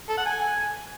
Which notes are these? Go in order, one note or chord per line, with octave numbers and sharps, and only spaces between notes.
A4
F#5
G#5